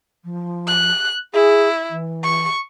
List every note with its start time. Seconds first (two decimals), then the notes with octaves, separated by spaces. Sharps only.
0.24 F3
0.67 F#6
1.34 E4 G#4
1.90 E3
2.24 C#6